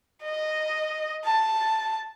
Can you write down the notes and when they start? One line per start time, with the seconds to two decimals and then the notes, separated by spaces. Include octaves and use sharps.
0.23 D#5
1.25 A5